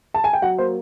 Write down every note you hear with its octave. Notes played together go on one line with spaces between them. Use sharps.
A5
G#5
G5
F#3 F#5
A#3 C5